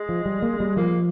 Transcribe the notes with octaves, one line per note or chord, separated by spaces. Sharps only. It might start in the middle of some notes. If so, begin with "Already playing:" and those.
Already playing: G#3
F3
G3
A#3
G3
F3 A#3